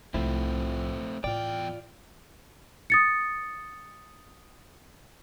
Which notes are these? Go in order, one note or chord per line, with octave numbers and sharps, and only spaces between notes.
C2 A2 F3 A3 C4 E4 F4
E2 A2 F4 D5 G5
D#6 A6 C#7